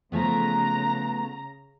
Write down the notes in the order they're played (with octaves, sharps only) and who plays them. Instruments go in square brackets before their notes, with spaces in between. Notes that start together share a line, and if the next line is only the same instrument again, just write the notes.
[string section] C#3 A#5 [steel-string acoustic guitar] F3 A3 B3